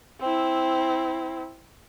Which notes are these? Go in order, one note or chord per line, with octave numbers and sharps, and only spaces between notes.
C4 E4